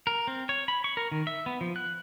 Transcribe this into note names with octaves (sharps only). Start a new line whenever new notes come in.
A#4
C4
C#5
B5
C#6
A#4
D#3
E5
B3
F3
F#6